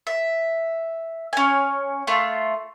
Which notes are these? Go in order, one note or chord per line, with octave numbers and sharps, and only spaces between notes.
E5
C#4 G#5
A3 F4